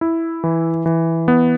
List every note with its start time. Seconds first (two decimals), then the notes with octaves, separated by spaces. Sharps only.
0.01 E4
0.44 E3
0.86 E3
1.28 B3